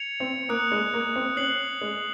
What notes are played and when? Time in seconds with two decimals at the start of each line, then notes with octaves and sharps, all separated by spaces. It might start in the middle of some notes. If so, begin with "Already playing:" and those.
Already playing: G#6 C#7 F7
0.20 C4
0.49 A#3 D#6 F#6 C#7
0.72 G#3
0.93 A#3
1.16 C4
1.36 C#4 F#6 C7 F#7
1.81 G#3